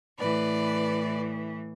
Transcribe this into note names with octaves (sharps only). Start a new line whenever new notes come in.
A2 E3 B4 D5